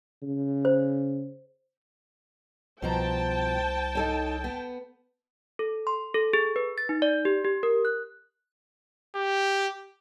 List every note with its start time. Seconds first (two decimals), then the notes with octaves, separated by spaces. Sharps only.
0.23 C#3
0.65 C5
2.82 C2 B2 F3 C5 G5 A5 A#5
3.95 D#4 A4 C#5
4.44 B3
5.59 A4
5.87 C6
6.14 A4
6.33 G#4
6.56 B4
6.78 A6
6.89 D#4
7.02 D5
7.25 G4
7.44 G4
7.63 A#4
7.85 F#6
9.15 G4